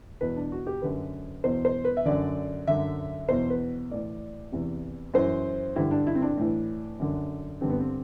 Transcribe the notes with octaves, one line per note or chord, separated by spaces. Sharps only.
E2 B2 B4
D4
F#4
G4
F#2 D3 B4
E2 B2 C5
C5
B4
E5
F#2 D3 D5
F#2 D3 E5
E2 B2 C5
B4
A2 E3 D5
E2 C3 E3
F#2 E3 C5
G2 D3 E4
D4
E4
C4
D4
A2 E3
F#2 D3
G2 D3 C4
B3
C4